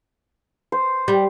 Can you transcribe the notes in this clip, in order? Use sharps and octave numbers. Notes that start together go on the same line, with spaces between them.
C5
G3